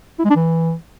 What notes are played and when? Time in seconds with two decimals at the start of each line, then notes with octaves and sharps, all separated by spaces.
0.19 E4
0.25 G#3
0.30 D4
0.36 E3